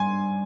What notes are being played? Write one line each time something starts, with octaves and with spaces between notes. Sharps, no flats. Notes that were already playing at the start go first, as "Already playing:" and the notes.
Already playing: G3 G#5 C6